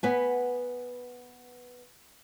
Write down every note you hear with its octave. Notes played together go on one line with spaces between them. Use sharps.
B3 B4 G#5